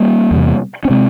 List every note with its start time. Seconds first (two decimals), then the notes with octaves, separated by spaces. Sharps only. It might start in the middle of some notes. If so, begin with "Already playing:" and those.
Already playing: G3 A#3
0.31 E2 C3
0.85 C#4
0.90 C3 G#3 C4